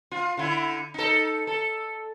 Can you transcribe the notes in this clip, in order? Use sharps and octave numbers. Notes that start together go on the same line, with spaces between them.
F4
D3 E4
D#4 A4
A4